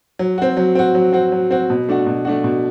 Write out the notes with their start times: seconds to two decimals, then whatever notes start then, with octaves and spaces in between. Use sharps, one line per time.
0.19 F#3
0.38 C4 F#4
0.57 F#3
0.75 C4 F#4
0.95 F#3
1.13 C4 F#4
1.32 F#3
1.51 C4 F#4
1.70 B2
1.89 A3 D4 F#4
2.06 B2
2.25 A3 D4 F#4
2.44 B2